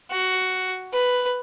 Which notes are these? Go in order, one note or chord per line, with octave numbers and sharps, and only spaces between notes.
F#4
B4